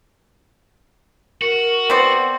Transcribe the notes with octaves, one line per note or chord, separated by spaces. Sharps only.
F#4 A#4
B3 C4 D5